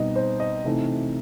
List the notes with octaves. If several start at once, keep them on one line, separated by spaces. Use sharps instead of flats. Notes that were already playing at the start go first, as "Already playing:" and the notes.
Already playing: B2 G3 C4 D#4 D#5
C5
D#5
C3 E3 A3 D#4